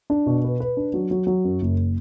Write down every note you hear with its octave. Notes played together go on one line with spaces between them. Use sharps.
D4
B2
B4
B4
D4
F#3
F#3
F#3
F#2
F#1